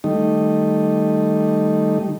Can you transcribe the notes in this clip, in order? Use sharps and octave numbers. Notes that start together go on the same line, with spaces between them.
D#3 G3 A3 D#4